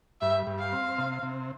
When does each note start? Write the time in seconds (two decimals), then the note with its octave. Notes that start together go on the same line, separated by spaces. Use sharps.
0.21 G2 E5
0.47 G2
0.59 F5
0.73 C4
0.98 C3
1.23 C3